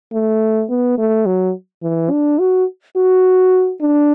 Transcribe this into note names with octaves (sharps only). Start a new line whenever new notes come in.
A3
B3
A3
F#3
E3
D4
F#4
F#4
D4